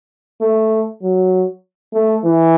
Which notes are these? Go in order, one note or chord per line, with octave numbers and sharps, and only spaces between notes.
A3
F#3
A3
E3